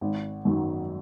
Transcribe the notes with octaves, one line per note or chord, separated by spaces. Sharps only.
G#1
F#2 D#3 F#3